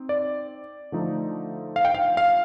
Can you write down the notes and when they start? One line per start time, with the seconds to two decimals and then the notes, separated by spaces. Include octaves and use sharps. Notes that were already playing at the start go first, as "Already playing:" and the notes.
Already playing: C4 D#4
0.09 D5
0.92 D3 F3 A3 D#4
1.76 F5
1.85 G5
1.95 F5
2.17 F5